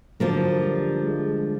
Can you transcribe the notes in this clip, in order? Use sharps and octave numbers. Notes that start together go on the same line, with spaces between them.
D3 F3 F#3 A#3
G3
G#3